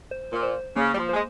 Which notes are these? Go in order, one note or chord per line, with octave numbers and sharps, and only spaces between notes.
C5
A#2
C5
C#3 A#3
G3
F3
G#3 C5